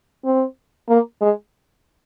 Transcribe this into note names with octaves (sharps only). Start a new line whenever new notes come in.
C4
A#3
G#3